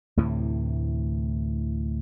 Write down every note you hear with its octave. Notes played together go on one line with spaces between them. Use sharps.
D2 A2 C3 E3